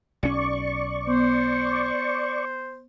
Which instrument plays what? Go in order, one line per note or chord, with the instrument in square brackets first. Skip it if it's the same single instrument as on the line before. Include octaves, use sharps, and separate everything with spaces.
[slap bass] B1 C#4 [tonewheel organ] D5 C#6
[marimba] B3 [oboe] C5